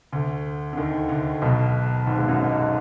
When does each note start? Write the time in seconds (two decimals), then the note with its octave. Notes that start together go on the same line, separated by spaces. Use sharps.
0.12 D2 D3
0.73 D3
0.77 D#2 D#3
1.09 D2 D3
1.42 B1 B2
2.07 G#1 G#2
2.18 G#3
2.28 F#2 F#3
2.49 G#2 G#3